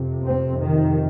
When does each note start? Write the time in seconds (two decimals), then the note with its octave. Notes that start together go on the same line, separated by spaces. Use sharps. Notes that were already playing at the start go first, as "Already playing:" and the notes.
Already playing: F2 C3
0.24 C4
0.59 D#3